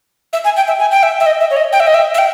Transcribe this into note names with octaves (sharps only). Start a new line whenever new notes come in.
E5
G#5
G5
E5
G#5
G5
E5
E5
D#5
E5
C#5
D#5
G5
E5
D#5
E5
E5
G5